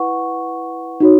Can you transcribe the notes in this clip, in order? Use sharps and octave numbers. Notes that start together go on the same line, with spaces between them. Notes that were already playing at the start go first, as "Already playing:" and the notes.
Already playing: E4 B4 F#5 C#6
D#4 F#4 C#5